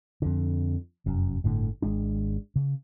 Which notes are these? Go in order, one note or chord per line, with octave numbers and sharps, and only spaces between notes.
F2 D3
F1 F#2
G1 A2 D3
G#1 G#3 D4
C#3